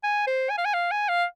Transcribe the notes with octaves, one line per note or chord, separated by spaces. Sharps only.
G#5
C5
G#5
F5
G#5
F5
G#5
F5